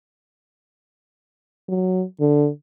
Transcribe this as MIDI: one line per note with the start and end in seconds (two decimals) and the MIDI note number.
1.69 2.04 54
2.20 2.48 50